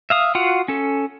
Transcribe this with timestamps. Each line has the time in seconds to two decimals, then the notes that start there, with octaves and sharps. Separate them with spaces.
0.10 E5 F5 D#6
0.35 F4 F#4 F5 F#5
0.68 C#4 A4